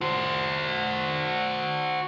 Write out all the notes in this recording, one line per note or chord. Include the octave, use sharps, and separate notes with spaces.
F#4 C5